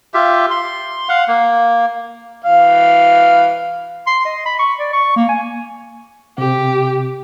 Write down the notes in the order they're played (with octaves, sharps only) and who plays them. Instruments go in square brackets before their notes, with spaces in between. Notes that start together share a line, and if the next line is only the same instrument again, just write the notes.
[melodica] F4 G4 E5
C6
F5 F#5
A#3
[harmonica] E3 F5
[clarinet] C6
D#5
B5
C#6
D5
C#6
A#3
G#5
[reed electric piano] C3 [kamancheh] G4